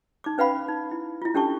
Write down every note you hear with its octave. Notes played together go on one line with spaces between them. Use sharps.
D#4 D6
C#4 B4 F5 F#5 B5
D#4
E4
E4 F4
C#4 D4 G4 A4 A5 C#6